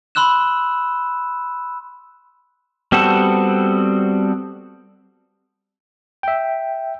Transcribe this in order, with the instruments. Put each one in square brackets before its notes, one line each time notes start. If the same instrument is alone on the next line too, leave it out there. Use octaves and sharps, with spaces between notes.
[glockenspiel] B5 C6 E6 F#6 E7
[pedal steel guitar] G3 B3 C4 F#4 A4
[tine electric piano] E5 G5